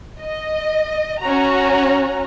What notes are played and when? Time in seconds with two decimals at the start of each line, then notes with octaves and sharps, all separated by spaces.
0.21 D#5
1.21 C#4 F#4 A#5